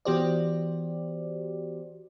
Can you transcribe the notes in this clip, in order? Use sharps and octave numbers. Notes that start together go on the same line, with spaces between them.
E3 B3 F#4 G4 C5 D5